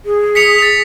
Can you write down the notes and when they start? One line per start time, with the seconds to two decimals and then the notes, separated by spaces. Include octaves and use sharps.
0.05 G#4
0.35 B6 C#7 F7
0.59 A6 F7